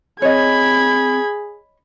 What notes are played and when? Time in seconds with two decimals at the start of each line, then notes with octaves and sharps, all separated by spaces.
0.22 C4 G#4 C#5 D#5 B5 G#6